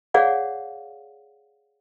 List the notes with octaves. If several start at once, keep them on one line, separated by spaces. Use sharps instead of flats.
G#4 C#5 D5 F5 F#5